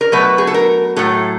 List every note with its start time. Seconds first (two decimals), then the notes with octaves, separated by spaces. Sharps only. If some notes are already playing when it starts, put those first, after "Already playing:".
0.01 A#4
0.12 B2 F#3 A3 B4
0.38 G#4
0.47 A4
0.54 A#4
0.96 A2 F#3 A3 A4